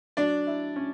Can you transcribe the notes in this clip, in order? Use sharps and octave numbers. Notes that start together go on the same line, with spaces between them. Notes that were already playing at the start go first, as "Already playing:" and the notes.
F#3 D4 D5
E4
C#4